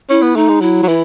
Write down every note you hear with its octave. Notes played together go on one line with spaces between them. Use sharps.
C#4 E4
B3
A3 D#4
G#3
F#3 E4
F#3
E3 E4